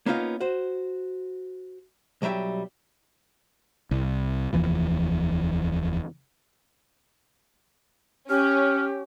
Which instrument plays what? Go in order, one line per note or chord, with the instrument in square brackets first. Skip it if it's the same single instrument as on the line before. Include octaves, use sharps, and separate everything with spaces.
[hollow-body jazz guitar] A#3 B3 C#4 D#4 F4 F5
F#4 C5
B1 F#3 G3 E5 G5
[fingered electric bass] C2
F1 D#2 E3 F3
[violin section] C#4 [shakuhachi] G4 [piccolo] F6